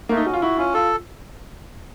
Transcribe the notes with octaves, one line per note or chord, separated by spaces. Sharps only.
A3 A#3
D#4
C#4 F#4
F4
E4 F#4
C#4 F4
F4 A4